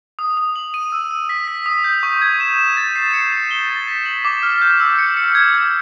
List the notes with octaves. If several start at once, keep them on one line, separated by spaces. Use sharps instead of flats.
D#6
D#6
F#7
D#7
E6
E6
B6
B6
D#6
G6
C#6
G#6
E7
E7
A6
C7
C#7
E7
G7
A6
B6
F#7
D6
F6
G6
E6
C#7
C#7
G#6
G#6